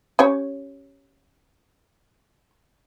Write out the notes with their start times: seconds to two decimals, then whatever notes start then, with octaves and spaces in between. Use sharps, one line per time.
0.19 C#4 G4 C#5